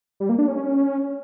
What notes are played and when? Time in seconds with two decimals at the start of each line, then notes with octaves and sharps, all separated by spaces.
0.20 G3
0.29 A#3
0.38 D4
0.48 C#4